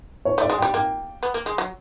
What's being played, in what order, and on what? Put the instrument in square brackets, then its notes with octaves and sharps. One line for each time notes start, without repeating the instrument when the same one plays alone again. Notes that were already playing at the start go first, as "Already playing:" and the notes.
[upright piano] C#5
[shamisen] A3 [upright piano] D5
[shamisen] G#3
[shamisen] G3 [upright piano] G5
[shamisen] A#3 [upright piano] G5
[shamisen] B3
A#3
G#3
F#3